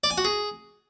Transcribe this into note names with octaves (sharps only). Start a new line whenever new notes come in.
D5
G#5
F#4
G#4